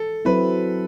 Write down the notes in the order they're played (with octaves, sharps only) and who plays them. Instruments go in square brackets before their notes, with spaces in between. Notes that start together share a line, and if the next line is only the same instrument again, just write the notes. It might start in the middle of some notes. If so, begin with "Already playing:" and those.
Already playing: [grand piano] A4
[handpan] F#3 C4 E4 [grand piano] B4